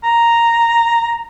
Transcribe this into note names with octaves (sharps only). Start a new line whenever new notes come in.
A#5